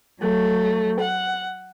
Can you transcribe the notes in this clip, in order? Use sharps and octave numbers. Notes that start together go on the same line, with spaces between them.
F#3 A3
F#5